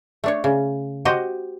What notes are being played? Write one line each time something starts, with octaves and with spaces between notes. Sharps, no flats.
A3 D4 C#5
C#3
F#4 G4 C5 D#5